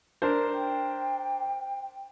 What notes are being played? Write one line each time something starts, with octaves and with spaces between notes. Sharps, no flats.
D4 A#4 C5
G5